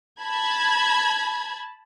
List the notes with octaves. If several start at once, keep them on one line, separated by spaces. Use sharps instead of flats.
A5 B5 G#6